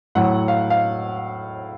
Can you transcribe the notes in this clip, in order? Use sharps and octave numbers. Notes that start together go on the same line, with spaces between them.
A2 F#3 F#5
F5
F5